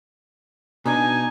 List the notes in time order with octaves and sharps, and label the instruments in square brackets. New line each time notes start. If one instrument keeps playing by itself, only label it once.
[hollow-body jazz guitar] B2 D4 [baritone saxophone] D#4 [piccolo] G#5